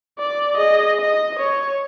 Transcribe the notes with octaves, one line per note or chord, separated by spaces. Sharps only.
D5
G#4 D#5
D#5
C#5